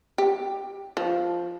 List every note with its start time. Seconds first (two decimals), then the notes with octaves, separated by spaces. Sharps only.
0.18 G4
0.97 F3